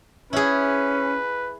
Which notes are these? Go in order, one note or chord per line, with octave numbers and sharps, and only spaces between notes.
C#4 E4 G#4 B4